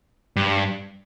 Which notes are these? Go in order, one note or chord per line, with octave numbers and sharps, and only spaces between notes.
G2